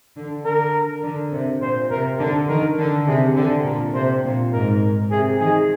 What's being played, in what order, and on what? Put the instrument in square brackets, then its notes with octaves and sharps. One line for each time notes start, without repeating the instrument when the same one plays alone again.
[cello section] D3
[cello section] D3 [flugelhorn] A#4
[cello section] D3
C3
[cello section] A#2 [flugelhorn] C5
[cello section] C3 [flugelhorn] A#4
[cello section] D3
[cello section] D#3 [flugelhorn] A#4
[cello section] D3
[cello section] C3 [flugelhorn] G#4
[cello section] D3 [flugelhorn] G4
[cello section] A#2 [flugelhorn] A#4
[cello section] C3 [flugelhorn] C5
[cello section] A#2
[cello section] G#2 [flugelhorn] A#4
[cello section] C3 [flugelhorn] G#4
[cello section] D#3 [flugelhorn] G#4